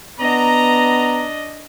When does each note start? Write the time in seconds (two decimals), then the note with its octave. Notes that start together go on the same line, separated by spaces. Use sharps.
0.19 B3 D4 D#5 A#5